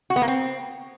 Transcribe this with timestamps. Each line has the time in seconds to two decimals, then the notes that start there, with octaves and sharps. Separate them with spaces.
0.10 F#4
0.16 B3
0.22 A#3
0.28 C4